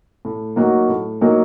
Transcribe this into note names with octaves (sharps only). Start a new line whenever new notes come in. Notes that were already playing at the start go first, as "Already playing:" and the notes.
A2
F#3 A#3 D#4 F#4
A2
F#3 A#3 D#4 F#4